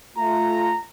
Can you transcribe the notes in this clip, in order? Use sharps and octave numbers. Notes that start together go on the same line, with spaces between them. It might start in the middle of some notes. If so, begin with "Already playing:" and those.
A3 F4 A#5